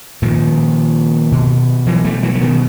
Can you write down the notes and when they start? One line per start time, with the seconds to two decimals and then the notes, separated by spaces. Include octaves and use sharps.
0.22 A#2 D#3 F3
1.32 B2
1.87 E3 F#3
2.05 G3 A3
2.23 E3 F#3
2.35 D3
2.41 B2 D#3